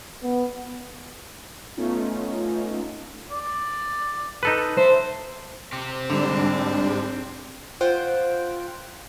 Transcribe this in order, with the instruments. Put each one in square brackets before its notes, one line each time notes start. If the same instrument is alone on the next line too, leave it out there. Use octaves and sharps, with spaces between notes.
[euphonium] B3
[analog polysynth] A3 B3 C#4 D#4 F4
[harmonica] D5
[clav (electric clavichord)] D#4 A4 B4
[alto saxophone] C5 [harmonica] E5 A5
[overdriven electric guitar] C4 G4
[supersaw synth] G#2 G3 D4 [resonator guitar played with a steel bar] D3
[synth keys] F4 C5 F#5 G5 D7